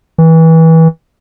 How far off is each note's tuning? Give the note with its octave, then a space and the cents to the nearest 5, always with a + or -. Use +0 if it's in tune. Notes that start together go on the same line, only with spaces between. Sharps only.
E3 -25